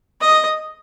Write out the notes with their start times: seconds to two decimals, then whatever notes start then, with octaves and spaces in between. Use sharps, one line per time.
0.21 D#5